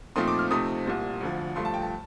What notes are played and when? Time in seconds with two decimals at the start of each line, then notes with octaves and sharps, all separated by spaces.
0.16 A#2 F3 A3 C4 D#4 C6
0.28 D6
0.39 F6
0.51 C3 F3 A3 C4 D#4 D#6
0.86 C2 A#2 G3
1.21 D2 D3 F3
1.56 G2 F3 A3 C6
1.65 A5
1.74 G5
1.82 A5